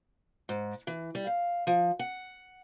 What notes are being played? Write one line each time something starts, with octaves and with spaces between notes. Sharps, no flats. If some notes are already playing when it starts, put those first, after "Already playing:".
G#2
E3
G3
F5
F3
F#5